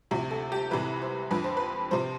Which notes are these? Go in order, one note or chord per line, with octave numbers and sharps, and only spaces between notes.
D2 C3 F3
A4
G4
C2 C3 E3 B4
C5
F2 D3 F3 B4
C5
B4
C3 F3 C5